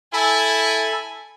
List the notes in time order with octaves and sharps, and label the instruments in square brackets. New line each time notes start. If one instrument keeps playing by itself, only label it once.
[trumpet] E4 [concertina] A4 B5 [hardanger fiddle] G#5